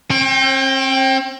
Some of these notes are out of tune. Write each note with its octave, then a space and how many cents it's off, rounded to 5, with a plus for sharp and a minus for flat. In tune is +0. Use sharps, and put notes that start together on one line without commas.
C4 +40 G5 +0